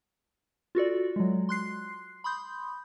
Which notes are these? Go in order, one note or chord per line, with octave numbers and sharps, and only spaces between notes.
F4 F#4 A4 D5
F#3 G#3
C6 F#6 C7
B5 C6 D#6 G6